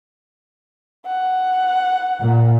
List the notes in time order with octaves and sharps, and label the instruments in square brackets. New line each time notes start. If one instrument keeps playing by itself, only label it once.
[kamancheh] F#5
[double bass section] A#2